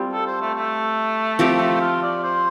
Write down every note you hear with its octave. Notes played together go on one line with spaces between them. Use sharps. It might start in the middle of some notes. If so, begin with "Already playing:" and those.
Already playing: G3 C4 F4
A4
C5
A3
A3
F3 C4 G4
F4
D5
C5